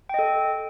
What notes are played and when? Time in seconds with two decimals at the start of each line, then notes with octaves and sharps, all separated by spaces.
0.09 G5
0.14 D#5
0.19 A4